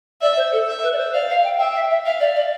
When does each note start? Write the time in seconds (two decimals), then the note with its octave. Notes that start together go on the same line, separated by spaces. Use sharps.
0.21 D5 E5
0.37 C5
0.52 A4
0.68 E5
0.83 B4
0.93 D5
0.98 C5
1.13 D5 F5
1.29 F5
1.44 G5
1.59 E5 G5
1.75 E5
1.90 E5
2.05 E5 F5
2.20 D5
2.36 D5